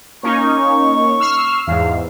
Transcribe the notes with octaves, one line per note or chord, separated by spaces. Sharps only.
A#3 C#4 D#4 C#6
E6 F6 C7
E2 G#2 F5